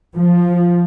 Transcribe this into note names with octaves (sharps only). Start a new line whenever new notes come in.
F3